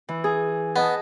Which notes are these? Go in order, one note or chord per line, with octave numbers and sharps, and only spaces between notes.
E3
G#4
B3 D#5 A5